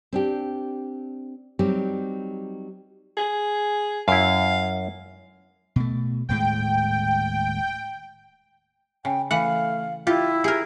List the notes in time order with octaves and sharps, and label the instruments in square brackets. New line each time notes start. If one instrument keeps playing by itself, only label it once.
[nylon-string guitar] C4 D4 G4
F#3 G3 C4 D#4 G4
[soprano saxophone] G#4
[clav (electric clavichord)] F#2 E4 [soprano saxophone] F5
[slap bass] B2 A3
[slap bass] D#1 A2 G#3 [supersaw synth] G5
[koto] C#3 [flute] G5
[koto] E3 F#5 [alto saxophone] A3 [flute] F5
[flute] E4 [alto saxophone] F4 [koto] G4
[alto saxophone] G4 [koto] G#4 A#4